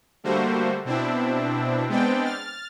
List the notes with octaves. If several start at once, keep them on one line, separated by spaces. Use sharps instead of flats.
D3 G3 A3 A#3 F#4 C5
B2 C4 D4 E4
G#3 B3 C4 D4 D5 G5
F6 A6